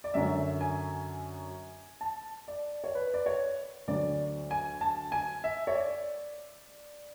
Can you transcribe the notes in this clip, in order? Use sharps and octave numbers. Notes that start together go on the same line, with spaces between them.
D5
F#2 D3 F#3 E5
G#5
A5
D5
C#5
B4
D5
C#5
D2 D3 F#3 D5
G#5
A5
G#5
E5
C#5
D5